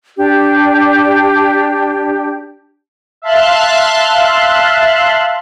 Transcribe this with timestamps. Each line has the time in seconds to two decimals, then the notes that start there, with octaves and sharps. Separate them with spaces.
0.17 D4 G4
3.22 E5 F5 A5 C6 F#6